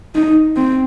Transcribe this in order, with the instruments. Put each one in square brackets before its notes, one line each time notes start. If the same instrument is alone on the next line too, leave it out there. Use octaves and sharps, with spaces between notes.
[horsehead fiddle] D#4
C4